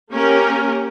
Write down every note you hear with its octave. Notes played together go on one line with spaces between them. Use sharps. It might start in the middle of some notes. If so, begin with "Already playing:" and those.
A#3 C#4 G4 A#4